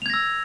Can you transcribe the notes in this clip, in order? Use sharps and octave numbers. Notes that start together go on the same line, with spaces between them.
E6 G#6 A#6 F7